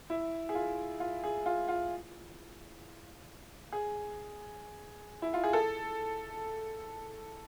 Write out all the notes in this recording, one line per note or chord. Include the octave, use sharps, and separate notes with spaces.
E4
G#4
F4
F4
G#4
F4
F4
G#4
E4
F4
G#4
A4